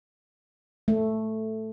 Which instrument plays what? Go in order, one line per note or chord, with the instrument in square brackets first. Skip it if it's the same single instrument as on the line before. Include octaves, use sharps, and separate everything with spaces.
[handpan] A3